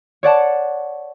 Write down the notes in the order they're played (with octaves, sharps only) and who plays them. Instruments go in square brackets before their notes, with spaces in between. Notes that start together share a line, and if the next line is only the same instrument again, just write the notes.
[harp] C#5 D5 F#5 A5